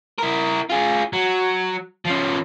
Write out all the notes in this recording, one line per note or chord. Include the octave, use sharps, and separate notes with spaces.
E4 A#4
F4 G#4
F#3
F3 C#4